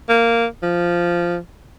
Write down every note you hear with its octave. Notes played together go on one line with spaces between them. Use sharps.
A#3
F3